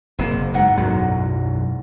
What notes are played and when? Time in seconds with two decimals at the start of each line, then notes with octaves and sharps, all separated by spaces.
0.19 F#1 C3 A#3
0.53 E2 G#2 F#5
0.77 B1 F#2 F#3